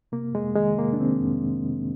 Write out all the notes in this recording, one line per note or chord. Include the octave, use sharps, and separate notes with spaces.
C3 A#3
F2 G#3
D#3 G#3
C3 A#3
D4
D#3 C4
F2
C3
C3